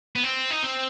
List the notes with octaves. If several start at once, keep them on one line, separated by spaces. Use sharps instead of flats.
B3
C4
D#4
C4